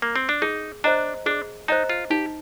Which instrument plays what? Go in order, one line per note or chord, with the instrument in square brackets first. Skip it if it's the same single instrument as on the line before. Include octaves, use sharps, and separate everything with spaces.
[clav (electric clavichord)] A#3
C4
D4
[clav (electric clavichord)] D#4 [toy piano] G#4
[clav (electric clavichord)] D4 [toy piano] C5 D#5 A#5
[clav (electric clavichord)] D4 [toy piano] G#4
[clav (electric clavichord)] D#4 [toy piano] C5 D#5 A#5
[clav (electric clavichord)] F4
[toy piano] D#4 [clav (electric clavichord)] G4